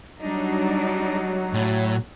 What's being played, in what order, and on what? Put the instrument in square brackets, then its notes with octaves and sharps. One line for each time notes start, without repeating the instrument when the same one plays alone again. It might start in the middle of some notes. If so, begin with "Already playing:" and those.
[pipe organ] F#3 [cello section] G3 D4 D#4
[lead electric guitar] A2